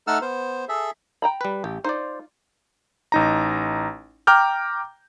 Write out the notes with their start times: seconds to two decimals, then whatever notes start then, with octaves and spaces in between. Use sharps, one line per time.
0.07 A3 D#4 A4 F#5 E6 F6
0.22 B3 C5
0.69 G#4 A4 E5
1.22 G5 A#5 B5
1.41 G3 B4
1.64 A1 G4
1.85 D#4 F4 C5 D5
3.12 A1 D#4 A#5
4.27 G5 A#5 D6 F6 G6